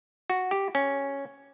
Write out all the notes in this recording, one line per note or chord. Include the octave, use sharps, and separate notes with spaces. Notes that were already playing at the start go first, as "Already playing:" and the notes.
F#4
G4
C#4